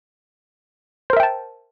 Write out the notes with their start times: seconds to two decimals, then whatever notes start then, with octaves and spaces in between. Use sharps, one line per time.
1.10 C5
1.13 A#4
1.17 E5
1.20 G5
1.23 A5